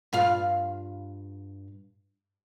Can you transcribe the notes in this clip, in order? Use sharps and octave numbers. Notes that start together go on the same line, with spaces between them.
G2 F4 F5